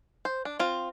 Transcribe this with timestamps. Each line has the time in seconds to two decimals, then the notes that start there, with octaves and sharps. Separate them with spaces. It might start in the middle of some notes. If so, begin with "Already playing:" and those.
0.25 C5
0.45 D4
0.59 C4 F4